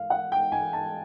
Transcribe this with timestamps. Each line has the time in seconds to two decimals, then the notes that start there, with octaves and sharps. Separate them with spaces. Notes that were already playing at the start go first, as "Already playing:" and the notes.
Already playing: F5
0.10 F#5
0.32 G5
0.52 G#5
0.73 A5